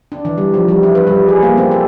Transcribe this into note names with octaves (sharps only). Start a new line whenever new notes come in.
D4
E3
G3
F3
G3
E4
B4
G3
G#4
A#3
C4
A4